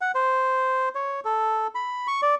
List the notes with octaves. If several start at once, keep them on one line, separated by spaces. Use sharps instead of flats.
F#5
C5
C#5
A4
B5
C#6
D5